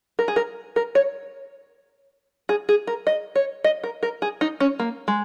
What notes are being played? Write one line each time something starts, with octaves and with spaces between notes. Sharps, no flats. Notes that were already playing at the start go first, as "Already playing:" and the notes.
A#4
G#4
A#4
A#4
C#5
G#4
G#4
A#4
D#5
C#5
D#5
A#4
A#4
G#4
D#4
C#4
A#3
G#3